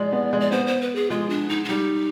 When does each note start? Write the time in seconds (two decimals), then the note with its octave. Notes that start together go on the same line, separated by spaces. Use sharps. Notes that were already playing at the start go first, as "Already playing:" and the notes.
Already playing: F3 G#3 D5
0.13 B3
0.33 G#3
0.41 D5
0.52 B3 C5
0.67 C5
0.81 B4
0.95 G#4
1.10 G#3 F4
1.30 D4
1.49 D#4
1.64 D4
1.68 G3 D#4